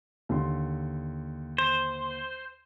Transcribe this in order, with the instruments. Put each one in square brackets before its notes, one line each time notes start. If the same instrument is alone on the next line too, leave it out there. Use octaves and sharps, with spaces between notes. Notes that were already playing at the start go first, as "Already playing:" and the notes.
[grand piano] D#2 D3 C6
[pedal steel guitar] C5